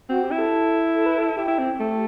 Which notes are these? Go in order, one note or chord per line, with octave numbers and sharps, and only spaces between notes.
C4 F#4
G4
E4
A4
A4
B4
A4
E4 G4
E4
C4
A3